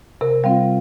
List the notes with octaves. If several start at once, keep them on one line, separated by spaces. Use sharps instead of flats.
C3 A#4
G3 C4 F4 F5